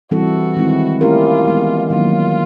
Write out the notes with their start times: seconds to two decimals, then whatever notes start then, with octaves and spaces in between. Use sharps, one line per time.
0.11 E3 G3 C4 E4 F#4 A4
0.56 D#3 G#3 C4 E4
1.01 A3 C#4 E4 F4 G4 A#4
1.46 E3 G#3 B3
1.90 D#3 F#3 A#3 C#4 F4